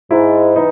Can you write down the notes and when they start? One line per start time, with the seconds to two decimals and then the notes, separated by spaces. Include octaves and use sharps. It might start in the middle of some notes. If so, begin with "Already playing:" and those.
0.11 G#2 E4
0.56 E3 D#4